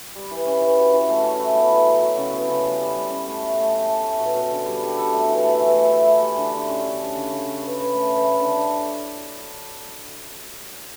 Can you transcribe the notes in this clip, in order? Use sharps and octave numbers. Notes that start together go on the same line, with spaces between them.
G3
E3
C#4
E3
F#4
E3
A3
C#4
E4
B3
E4
F#3
F#3
C#3
B3
C#3
G3
G3
G3
C#4
A3
A3
A3
A3
A3
A3
B2
B2
D3
G3
G3
A4
A3
E3
A3
E3
A3
E4
E4
G4
D3
D3
C#4
D3
C#4
C#3
C#3
C#3
B4
B4
A3
B4
A3
D3
D4